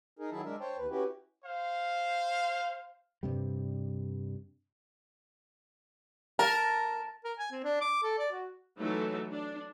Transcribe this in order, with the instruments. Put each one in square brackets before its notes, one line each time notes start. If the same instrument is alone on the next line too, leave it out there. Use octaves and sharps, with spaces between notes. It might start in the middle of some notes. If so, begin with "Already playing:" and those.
[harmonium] D#4 G#4 A#4
D#3 F#3 E4 G#4 E5 A5
G#3 D4 A#4 E5
C5 C#5 G5 A5
D#2 B4
C#4 E4 F#4 G4 B4
[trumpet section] C5 F5
[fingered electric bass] G2 C3 G3
[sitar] A#4 [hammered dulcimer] A5
[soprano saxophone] A#4
G#5
C4
D4
D6
A4
D5
F#4
[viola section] E3 F#3 A3 D#4 A4 E5
D4